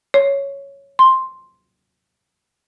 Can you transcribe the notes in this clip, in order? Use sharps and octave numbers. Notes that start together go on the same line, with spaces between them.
C#5
C6